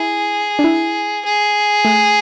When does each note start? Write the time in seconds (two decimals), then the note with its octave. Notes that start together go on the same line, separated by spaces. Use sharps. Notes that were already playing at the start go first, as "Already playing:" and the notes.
Already playing: E4 G#4
0.59 D4
0.64 E4
1.25 G#4
1.85 A3